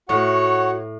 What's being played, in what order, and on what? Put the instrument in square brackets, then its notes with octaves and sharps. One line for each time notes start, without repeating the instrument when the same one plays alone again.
[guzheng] A2 [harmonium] F#4 F#5 [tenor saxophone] C#5